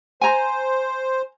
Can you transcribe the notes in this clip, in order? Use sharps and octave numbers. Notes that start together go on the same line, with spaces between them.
C5 G#5 A#5